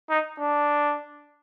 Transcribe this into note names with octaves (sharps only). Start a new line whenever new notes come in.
D#4
D4